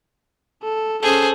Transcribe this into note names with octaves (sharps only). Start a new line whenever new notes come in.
A4
C#4 G#4 A4 C5